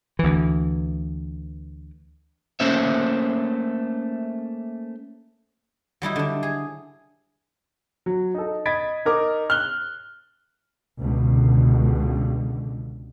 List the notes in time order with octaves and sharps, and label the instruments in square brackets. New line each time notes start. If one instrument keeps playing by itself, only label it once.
[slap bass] D2 E3
[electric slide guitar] A3 A#3 C#4 C5 C#5 E5
[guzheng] F#3 G3 D#4 E4
D3 D4
G#4
[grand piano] F#3
D#4 A4
D#5 B5 G#6 A6 B6 D7
D#4 A#4 D6
F6 F#6 G7
[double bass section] C#2 B2 D3